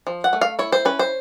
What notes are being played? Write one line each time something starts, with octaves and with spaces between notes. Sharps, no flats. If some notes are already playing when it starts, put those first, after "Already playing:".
F3
F#5
A3
F5
E4 C#5
C5
C#4 B4
C5